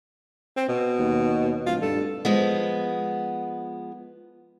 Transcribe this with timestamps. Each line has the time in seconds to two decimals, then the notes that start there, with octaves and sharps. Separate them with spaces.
0.57 C4
0.68 B2
0.98 D#2
1.66 D1 F4
1.82 G2 A4
2.25 F3 G#3 B3